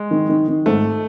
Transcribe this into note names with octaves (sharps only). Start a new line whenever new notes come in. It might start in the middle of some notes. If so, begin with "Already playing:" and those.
Already playing: G#3
D#3
D#3
D#3
G#2 A3